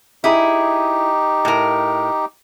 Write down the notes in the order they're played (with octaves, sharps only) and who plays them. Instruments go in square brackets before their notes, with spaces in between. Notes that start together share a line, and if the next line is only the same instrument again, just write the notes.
[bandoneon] D#4 G4 [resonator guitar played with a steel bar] E4 G#4
[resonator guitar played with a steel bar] A2 A#4